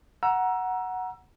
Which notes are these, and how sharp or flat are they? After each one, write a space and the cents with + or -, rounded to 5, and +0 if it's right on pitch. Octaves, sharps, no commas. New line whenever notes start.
F#5 +0 A#5 +20 E6 +20